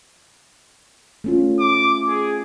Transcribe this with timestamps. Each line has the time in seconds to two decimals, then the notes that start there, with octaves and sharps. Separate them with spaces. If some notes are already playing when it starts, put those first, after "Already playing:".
1.24 A3 C#4 F4
1.60 D6
2.08 G#4